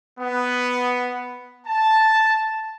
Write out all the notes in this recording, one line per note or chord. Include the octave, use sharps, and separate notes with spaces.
B3
A5